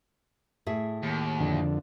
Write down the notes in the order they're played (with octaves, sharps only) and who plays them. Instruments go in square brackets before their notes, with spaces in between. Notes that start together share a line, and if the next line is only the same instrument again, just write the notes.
[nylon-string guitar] A2 G#4 E5
[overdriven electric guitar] D#2
[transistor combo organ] F2 D3